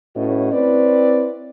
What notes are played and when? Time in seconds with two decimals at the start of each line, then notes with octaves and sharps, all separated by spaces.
0.16 A2 C#4 F#4 B4 D#5
0.52 C4 E4 B4 C#5 D5